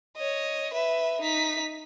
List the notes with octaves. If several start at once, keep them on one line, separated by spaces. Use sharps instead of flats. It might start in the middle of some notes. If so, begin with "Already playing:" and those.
C#5 D#5
B4 E5
D#4 B6